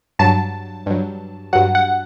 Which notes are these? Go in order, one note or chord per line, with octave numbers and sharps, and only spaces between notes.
G2 F#3 A5
G2 F#3
G2 F#3 F#5
F#5